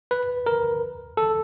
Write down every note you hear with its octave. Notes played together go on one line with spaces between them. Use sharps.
B4
A#4
A4